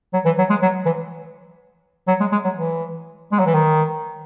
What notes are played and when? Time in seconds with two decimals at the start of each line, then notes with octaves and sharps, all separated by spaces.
0.13 F#3
0.25 E3
0.38 F#3
0.50 G#3
0.62 F#3
0.86 E3
2.08 F#3
2.20 G#3
2.32 G#3
2.44 F#3
2.56 E3
3.32 G#3
3.39 F#3
3.46 E3
3.54 D#3